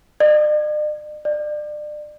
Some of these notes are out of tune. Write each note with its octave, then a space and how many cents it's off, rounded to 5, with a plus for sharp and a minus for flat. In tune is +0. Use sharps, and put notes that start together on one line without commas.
D5 +45
D5 +30